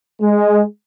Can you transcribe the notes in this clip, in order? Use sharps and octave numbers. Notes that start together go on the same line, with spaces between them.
G#3